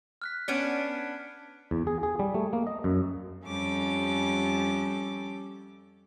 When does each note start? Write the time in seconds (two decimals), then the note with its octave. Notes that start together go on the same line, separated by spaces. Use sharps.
0.22 F6 F#6 B6
0.48 B3 C#4 D4 C#7 D7
0.73 D7
1.71 E2
1.87 G#4
2.03 G#4
2.19 G3
2.34 A3
2.53 A#3
2.67 D#5
2.84 F#2
3.45 F2 G3 C#4 G4 A4 D6